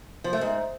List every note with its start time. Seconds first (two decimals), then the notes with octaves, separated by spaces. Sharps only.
0.24 F3
0.33 A3
0.41 G#2